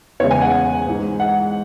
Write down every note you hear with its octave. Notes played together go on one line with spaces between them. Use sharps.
E2 C#3 G#3 C#5
G#5
F#5
G#2 E3 G#3
F#5